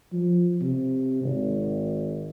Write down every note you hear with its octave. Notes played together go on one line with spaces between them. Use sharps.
F3
C3
G#1